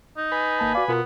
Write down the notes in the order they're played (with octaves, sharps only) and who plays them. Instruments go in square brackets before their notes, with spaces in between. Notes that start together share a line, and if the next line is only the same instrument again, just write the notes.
[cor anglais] D#4
[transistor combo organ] B4 G#5 B5
[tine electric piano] G#1 A#3 A5
[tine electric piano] F#4 F5 [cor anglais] D5
[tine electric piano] B2 F4 A#4 [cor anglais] B3